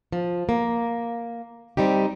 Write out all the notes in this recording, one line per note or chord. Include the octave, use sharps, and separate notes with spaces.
F3
A#3
G3 C4 D#4 G4